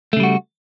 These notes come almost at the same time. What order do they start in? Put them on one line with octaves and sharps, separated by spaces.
A3 C#3 G3 F#4